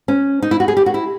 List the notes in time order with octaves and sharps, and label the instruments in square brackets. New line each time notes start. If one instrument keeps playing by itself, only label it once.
[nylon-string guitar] C#4
D#4
E4
F#4
G#4
G4
F#4
E4